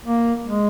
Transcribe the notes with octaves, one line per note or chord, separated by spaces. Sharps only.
A#3
G#3